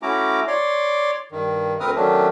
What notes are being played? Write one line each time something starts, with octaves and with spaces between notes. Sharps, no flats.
A3 C#4 E4 F#4 A#5 D6
C#5 D5 C6 D6
G2 D#3
D2 C4 A#4 B4 D#6 F6
D#3 F#3 A3 C#4 D4